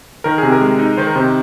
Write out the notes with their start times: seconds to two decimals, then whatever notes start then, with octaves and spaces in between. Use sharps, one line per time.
0.24 D#3 A#4
0.38 C3 G#4
0.52 A#4
0.61 G#3
0.79 D#4
0.97 D#3 C5
1.07 A#4
1.15 C3 C5